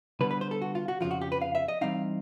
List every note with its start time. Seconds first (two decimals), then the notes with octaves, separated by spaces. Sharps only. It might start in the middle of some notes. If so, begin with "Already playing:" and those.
0.21 D3 G3 B3 B4
0.31 B4
0.41 C5
0.51 A4
0.61 F#4
0.75 F4
0.88 F#4
1.01 F2 C#3 F3 F4
1.11 F#4
1.21 G4
1.32 B4
1.42 F5
1.55 E5
1.68 D#5
1.81 E3 G3 C4 D#4 F5